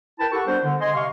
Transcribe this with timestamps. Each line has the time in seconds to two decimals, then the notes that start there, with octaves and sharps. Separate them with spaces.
0.19 E4 A#4 B4 G5 A5
0.32 E4 G4 A4 A#4 F#5 C#6
0.47 G3 B3 D4 F#4 C5
0.64 D3
0.81 D#5 G#5 C6
0.95 C3 F5 C#6